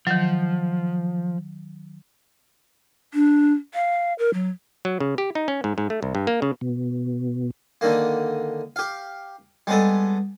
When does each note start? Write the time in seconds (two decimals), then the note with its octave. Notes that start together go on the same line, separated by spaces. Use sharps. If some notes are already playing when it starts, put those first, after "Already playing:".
0.07 D#3 F3 F#3
3.14 D4
3.74 F5
4.19 A#4
4.34 F#3
4.85 F#3
5.00 C#3
5.18 G4
5.35 D#4
5.48 C#4
5.64 G#2
5.78 G#2
5.90 A3
6.03 C2
6.15 G2
6.27 A#3
6.42 C#3
6.61 B2
7.81 D3 D#3 A#3
8.76 G4 F5
9.67 G3 G#3 B3 A4